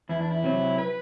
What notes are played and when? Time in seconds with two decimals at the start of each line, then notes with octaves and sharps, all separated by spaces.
0.09 E2 E4
0.20 D4
0.30 E4
0.43 C3 F#3 C4
0.78 B4